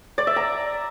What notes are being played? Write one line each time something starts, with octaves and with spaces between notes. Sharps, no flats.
D5
E5
A#5